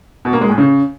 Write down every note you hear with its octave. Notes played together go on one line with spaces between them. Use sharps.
B2
A#3
G#3
A2
C#3